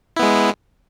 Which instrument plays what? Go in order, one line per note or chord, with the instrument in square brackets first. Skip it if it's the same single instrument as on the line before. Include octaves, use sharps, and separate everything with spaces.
[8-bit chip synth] E4
B3
G#3